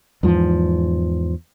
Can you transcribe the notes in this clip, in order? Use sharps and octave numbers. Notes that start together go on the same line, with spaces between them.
E2 G#2 F3